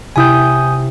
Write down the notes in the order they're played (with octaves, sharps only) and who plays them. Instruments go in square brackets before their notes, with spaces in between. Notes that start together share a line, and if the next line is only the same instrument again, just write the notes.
[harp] C3 E4 G5 [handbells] G#5 D#6 G6